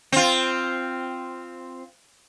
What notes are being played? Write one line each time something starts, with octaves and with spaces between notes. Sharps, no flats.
C4 F4